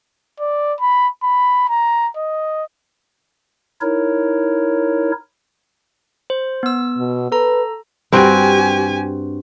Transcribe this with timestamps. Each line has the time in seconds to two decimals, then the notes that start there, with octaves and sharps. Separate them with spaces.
0.40 D5
0.80 B5
1.23 B5
1.69 A#5
2.16 D#5
3.81 D#4 E4 A#4 C#5
6.30 C5
6.63 B3 E6
6.98 B2
7.32 A4 B4 A#5
8.12 G2 C4 F#4 G4 G#5